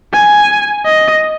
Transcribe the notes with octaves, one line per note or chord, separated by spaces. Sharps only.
G#5
D#5